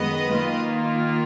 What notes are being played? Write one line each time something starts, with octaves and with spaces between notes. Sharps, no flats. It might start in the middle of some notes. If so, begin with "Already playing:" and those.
Already playing: F#2 D#3 G#3 B3 B4 D#5
D#3 A#3 F4